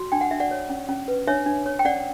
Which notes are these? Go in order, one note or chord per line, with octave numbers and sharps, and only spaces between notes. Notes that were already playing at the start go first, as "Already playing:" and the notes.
Already playing: F#4
D4 G5
F#5
D4 E5
D5 F#5
C#5
C#4
C#4
B4
D4 C#5 E5
D4
C#5
G5
C#4 D5 F#5